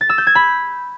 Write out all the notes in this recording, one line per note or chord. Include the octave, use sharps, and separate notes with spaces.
A6
E6
G6
G#6
B5